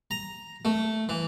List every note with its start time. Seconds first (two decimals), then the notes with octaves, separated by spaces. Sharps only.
0.11 A#5
0.65 A3
1.09 E3